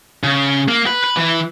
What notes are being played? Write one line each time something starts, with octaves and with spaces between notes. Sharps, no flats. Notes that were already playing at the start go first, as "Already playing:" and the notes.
C#3
A#3
B4
B4
E3